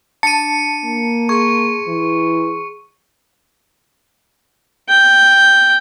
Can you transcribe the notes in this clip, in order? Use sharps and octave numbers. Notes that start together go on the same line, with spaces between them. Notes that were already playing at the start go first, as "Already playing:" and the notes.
D4 A5 C#7 D#7
A#3
G#4 C6 C#6
E3
G5